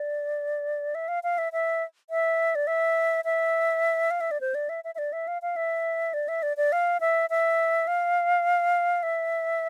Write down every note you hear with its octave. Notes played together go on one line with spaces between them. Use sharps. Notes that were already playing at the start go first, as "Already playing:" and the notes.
Already playing: D5
E5
F5
F5
E5
E5
E5
D5
E5
E5
F5
E5
D5
C5
D5
E5
E5
E5
D5
E5
F5
F5
E5
D5
E5
D5
D5
F5
E5
E5
F5
E5